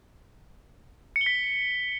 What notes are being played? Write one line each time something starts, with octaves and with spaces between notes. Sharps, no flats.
C#7
G7
B6